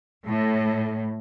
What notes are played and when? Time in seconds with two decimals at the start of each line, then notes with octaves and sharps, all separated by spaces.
0.25 A2